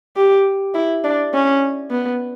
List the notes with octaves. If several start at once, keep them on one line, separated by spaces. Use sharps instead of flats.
G4
E4
D4
C#4
B3